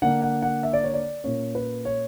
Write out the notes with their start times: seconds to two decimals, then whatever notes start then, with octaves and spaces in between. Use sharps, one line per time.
0.02 D3 A#3 D4 F#5
0.22 F#5
0.42 F#5
0.63 E5
0.73 D5
0.84 C#5
0.94 D5
1.24 A#2 A#3 C#4 C#5
1.55 B4
1.85 C#5